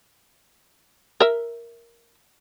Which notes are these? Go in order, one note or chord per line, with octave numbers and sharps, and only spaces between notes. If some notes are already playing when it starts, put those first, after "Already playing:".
A#4 E5